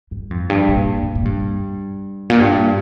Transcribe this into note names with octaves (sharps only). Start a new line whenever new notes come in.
G2
F2
G2
A#2
F2
A#2
G2
A#2
G2